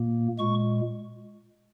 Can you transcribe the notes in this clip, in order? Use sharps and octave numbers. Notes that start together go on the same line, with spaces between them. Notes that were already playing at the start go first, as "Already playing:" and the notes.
Already playing: A#2 A#3
A#2 G#3 C#6